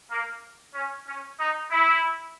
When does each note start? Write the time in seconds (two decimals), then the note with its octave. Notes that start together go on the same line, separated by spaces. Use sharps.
0.10 A#3
0.74 C#4
1.06 C#4
1.38 D#4
1.71 E4